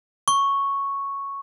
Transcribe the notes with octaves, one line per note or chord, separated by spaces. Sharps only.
C#6